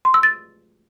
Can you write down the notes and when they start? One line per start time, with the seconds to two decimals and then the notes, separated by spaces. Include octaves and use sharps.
0.05 C6
0.14 E6
0.23 A6